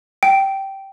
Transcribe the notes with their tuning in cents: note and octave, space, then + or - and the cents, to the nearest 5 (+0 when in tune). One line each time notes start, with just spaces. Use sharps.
G5 -10